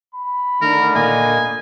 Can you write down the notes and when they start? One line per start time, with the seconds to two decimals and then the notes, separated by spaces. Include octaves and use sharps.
0.14 B5
0.62 D3 D#3 A3 A#4
0.96 A#2 A#3 D#5 G#5